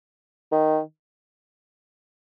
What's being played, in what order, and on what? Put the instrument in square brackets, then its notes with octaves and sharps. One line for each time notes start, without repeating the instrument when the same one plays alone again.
[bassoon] D#3